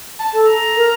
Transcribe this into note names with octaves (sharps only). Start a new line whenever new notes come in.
A5
A4
A#5
A#4